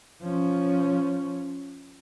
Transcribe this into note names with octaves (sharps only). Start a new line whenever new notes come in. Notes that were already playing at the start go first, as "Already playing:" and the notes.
F3 C#4